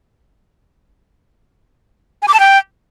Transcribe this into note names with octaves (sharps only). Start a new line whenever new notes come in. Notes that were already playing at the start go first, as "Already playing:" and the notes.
G#5
D6
A5
G5